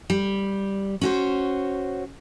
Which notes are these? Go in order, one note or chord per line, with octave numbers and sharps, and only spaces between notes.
G3
C#4 F#4 C5